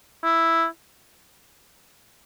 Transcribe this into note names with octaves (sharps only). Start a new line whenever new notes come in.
E4